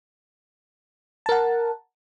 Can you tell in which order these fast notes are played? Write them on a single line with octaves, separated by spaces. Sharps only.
A5 A#4 F#5